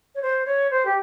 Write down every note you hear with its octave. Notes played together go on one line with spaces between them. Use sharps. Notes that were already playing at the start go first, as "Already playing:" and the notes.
C#5
C5
C#5
C5
G4